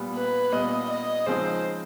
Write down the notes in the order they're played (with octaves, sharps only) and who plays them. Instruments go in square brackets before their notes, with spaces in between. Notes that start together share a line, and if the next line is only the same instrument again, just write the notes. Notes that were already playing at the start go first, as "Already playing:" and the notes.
Already playing: [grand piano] A#2 G3 B3
[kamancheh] B4
[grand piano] A#2 G3 B3 [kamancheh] D#5
[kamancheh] D#5
[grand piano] C#3 F3 G#3 C4 D#4 [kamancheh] C5